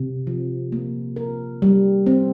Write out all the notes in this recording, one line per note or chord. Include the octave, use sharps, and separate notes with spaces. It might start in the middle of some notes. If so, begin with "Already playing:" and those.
Already playing: C3
F3
A#3
A#4
G3
C4